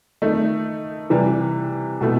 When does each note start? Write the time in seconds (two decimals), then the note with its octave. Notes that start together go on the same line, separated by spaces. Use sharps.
0.22 D#3 A3 D#4
1.10 C3 E3 G3
2.01 B2 A3 E4